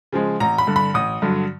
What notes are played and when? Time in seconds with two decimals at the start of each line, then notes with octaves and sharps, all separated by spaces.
0.12 C#3 F3 G#3
0.40 A1 A#5
0.58 B5
0.67 G2 D3
0.76 B5
0.94 A1 D#6
1.22 G2 D3 F#3